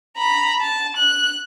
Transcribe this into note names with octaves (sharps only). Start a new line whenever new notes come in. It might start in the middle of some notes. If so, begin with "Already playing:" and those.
A#5 B5
A5
F#6